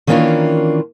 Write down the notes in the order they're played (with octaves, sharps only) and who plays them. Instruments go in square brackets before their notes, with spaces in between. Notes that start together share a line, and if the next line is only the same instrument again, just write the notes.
[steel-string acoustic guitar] D#3 E3 A#3 C#4 D4 F4